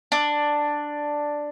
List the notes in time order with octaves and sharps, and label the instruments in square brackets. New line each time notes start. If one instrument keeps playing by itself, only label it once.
[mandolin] D4